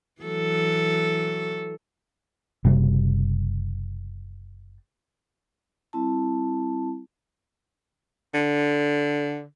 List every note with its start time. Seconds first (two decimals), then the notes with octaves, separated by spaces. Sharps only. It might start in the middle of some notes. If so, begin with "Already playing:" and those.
0.22 E3 F#3 A4
2.65 F#1 C3 G3
5.93 G3 C4 E4 A5
8.34 D3